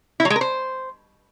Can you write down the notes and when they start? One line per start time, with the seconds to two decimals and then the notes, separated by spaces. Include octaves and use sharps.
0.20 E4
0.25 F#3
0.30 G#3
0.36 A#4
0.41 C5